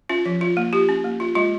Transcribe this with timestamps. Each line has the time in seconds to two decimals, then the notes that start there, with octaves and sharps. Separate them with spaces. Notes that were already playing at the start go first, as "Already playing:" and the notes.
0.09 C#4 F4
0.26 F3
0.41 F4
0.57 A#3
0.73 F4 G4
0.89 C#4
1.04 A#3
1.20 F4
1.35 G#3 F4